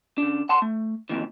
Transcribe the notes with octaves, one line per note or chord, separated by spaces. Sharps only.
C#3 D4
F#5 A5 C6
A3
F2 A#2 D#3 E3